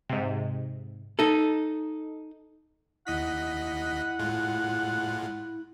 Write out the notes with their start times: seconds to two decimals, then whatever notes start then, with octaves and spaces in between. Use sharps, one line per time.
0.10 G#2 C3
1.19 D#4 A4
3.07 D#2 E4 D#5 F#5 B6
4.19 A2 G#3 F4